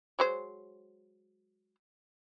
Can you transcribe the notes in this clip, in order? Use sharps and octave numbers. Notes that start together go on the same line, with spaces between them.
F#3 G#3 C5